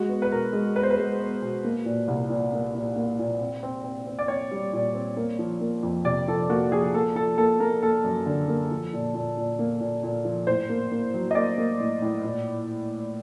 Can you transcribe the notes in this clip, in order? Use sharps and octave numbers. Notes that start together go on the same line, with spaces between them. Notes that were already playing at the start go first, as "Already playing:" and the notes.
Already playing: G#3 F#4
B3
B4
B2 A#4
G#3
B3 B4
C5
B4
G#3
B3
B2
A#3
A#2
C2
A#2
A#3
A#2
A#3
A#2
C4
C4
C4
C4
D5
C4 C#5
G3
A#2
C4
A#3
F3
A#3
F2
C3 D5
F3 A4
A#3 F#4
F3 G#4
A#3 A4
F3 A4
A#3 A4
A#3 A#4
A#3 A4
F#2
D3
A#3
F3
A#2
A#2
A#2
A#3
A#2
A#2
F3
A2 C5
A#3
A#3
F#3
D#5
A#3 D5
A#3
A2
A2
A#2